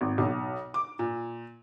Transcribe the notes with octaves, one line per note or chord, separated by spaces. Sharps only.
G#1
B1
D6
A#2